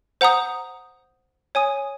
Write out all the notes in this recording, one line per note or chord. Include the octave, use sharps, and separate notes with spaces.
C5 F#5 A#5 D#6
C#5 G#5 D#6